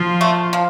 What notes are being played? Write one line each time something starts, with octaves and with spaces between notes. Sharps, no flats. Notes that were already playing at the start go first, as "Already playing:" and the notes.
Already playing: F3 F4
A3
F3